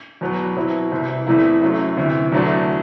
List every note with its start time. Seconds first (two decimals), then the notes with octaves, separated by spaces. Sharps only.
0.21 E2 B2 F#3 B3
0.56 B2 F#3 C4 E4
0.92 C2 C3 E3
1.27 E2 C3 E3 A3 E4
1.62 F#2 F#3 A3
1.97 D2 C3 E3
2.32 E2 D3 F#3 A3 D4